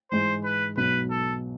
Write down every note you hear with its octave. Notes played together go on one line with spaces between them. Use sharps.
G#2 E3 G#3 C5
B4
B1 B2 F#3 B4
A4